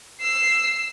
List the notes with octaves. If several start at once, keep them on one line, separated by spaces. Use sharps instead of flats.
E6 C7